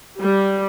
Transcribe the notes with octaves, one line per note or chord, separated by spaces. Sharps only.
G3